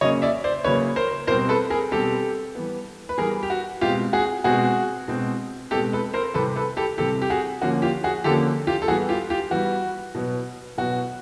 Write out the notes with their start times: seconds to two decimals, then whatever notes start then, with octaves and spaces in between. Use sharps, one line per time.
0.01 C#3 F#3 A#3 C#4 C#5 D#5
0.22 D5 E5
0.44 C5 D5
0.64 C#3 F#3 A#3 C#4 B4 C#5
0.96 A#4 C5
1.27 B2 G3 C4 A#4 C5
1.49 A4 B4
1.70 G#4 A#4
1.91 B2 G3 C4 G4 A4
2.55 E3 G3 B3
3.09 B4
3.18 E3 G3 B3 G#4 A#4
3.43 G4
3.50 F#4
3.81 B2 G#3 C4 F4 G4
4.13 F#4 G#4
4.44 B2 G#3 C4 F#4 G#4
5.08 B2 G#3 C4
5.71 B2 G#3 C4 G4 A4
5.93 A4 B4
6.14 A#4 C5
6.34 C3 E3 G3 C4 A4 B4
6.56 A4 B4
6.77 G4 A4
6.98 C3 E3 G3 C4 G4 A4
7.22 G4
7.30 F#4 G#4
7.62 D3 F3 A#3 C#4 F#4
7.82 F4 G4
8.04 F#4 G#4
8.24 D3 F3 A#3 C#4 G4 A4
8.67 F4 G4
8.82 A4
8.88 E3 G3 B3 F#4 G#4
9.09 F4 G4
9.30 F4 G4
9.51 E3 G3 B3 F#4
10.15 B2 F#3 B3
10.78 B2 F#3 B3 F#4